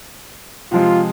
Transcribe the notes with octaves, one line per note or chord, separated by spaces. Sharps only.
C3 F3 G#3 F4